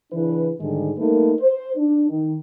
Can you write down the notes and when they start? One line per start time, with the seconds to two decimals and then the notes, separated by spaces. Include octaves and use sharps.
0.13 C#3 E3 D4 E4 B4
0.60 G#2 D3 D#3 G3 G#3
0.98 G3 A3 A#3 D#4 A#4 B4
1.40 C5
1.76 D4
2.09 D#3